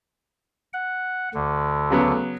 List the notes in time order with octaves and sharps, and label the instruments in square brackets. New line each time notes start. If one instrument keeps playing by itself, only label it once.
[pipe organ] F#5
D2 D3
[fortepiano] C#3 F#3 B3